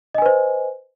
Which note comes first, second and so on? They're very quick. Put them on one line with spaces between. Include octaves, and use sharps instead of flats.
D#5 G#5 B4 C5